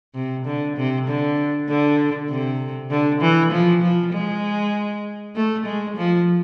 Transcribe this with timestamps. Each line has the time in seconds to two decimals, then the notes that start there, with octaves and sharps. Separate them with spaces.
0.15 C3
0.46 D3
0.77 C3
1.08 D3
1.68 D3
2.30 C3
2.91 D3
3.21 E3
3.52 F3
3.82 F3
4.13 G#3
5.35 A3
5.66 G#3
5.97 F3